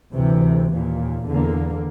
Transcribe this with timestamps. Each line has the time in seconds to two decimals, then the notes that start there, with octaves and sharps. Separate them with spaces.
0.14 D2 C3 E3
0.73 D#2 A#2
1.26 E2 D3 A#3